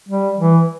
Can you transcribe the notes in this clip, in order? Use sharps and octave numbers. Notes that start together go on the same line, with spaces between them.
G3
E3